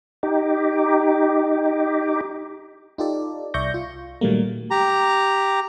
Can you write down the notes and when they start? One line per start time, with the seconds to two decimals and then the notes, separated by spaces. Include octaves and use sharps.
0.23 D#4 G4
2.98 D#4 F4 G4 A4 D5
3.54 C2 D5 E5 C#6 G6 A#6
3.74 F4
4.21 A#2 D#3 F#3 G3 A3 A#3
4.71 G4 A#5